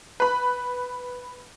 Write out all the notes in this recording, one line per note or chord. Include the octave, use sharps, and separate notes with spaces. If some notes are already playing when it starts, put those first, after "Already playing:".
B4 B5